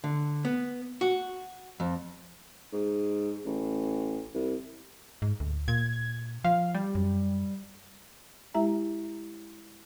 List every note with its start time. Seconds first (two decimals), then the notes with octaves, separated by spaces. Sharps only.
0.04 D3
0.45 B3
1.01 F#4
1.80 F2
2.73 G#2
3.45 A1
4.35 C2
5.22 G#2
5.40 D2
5.68 A#2 G#6
6.44 F3 F5
6.75 G3
6.95 F#2
8.54 G#3 E4 G4 E5 A#5